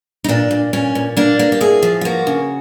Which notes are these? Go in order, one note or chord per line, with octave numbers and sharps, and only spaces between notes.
D#4
A#2 D4
A#2
A#2 C#4
A#2
A#3 D4
A#3
G4
A2 G#4
F3
F4
A#3 F#4
C#3